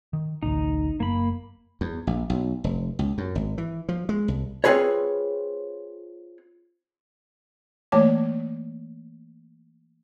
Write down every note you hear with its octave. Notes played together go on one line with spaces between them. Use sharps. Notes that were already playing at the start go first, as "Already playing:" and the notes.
D#3
A1 D2 D#4
F#1 A#3 B5
E2
A#1
B1
F1
C#2
F#2
G#1
E3
F3
G#3
C2
C4 F4 G#4 B4 C#5
E3 A3 A#3 C#5 A5 D6